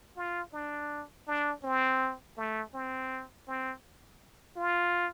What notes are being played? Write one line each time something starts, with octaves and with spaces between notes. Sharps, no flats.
F4
D4
D4
C4
A3
C4
C4
F4